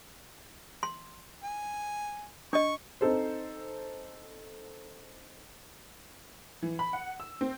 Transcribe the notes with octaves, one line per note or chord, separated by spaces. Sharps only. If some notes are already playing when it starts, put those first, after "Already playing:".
C6
G#5
D4 D#5 C#6
C4 D#4 A4 C5
E3
B5
F#5
E6
C4